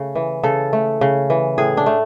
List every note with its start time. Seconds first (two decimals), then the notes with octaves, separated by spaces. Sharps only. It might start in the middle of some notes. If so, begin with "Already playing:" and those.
Already playing: C#3 A3
0.15 E3
0.43 C#3 A4
0.73 A3
1.01 C#3
1.30 E3
1.58 A2 G#4
1.77 D4
1.86 A3